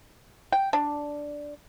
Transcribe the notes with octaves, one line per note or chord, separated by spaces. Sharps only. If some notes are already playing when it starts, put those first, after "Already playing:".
G5
D4